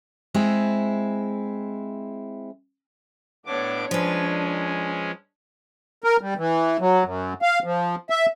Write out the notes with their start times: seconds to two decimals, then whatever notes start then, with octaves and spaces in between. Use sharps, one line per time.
0.34 G#3 C4 E4
3.46 A2 B3 D4 C#5 D6
3.91 F3 G#3 C#4 D4 B4
6.04 A#4
6.21 G3
6.37 E3
6.80 F#3
7.04 F#2
7.42 F5
7.64 F3
8.10 E5